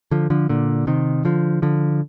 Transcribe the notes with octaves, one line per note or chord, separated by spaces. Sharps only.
D3 F3
D3 F3
A#2 D3
C3 D#3
D3 F3
D3 F3